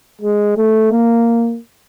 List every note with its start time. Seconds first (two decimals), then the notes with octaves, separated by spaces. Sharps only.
0.21 G#3
0.57 A3
0.92 A#3